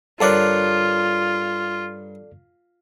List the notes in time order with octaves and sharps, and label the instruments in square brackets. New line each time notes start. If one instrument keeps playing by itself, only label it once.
[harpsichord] G2 A#4 C#5 [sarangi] F4 [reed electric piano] A4 D5 F#6